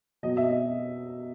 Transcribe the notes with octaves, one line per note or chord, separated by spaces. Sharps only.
B2 F#3 D#5
E5
D#5